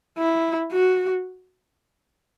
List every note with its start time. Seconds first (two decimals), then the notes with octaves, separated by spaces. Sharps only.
0.18 E4
0.72 F#4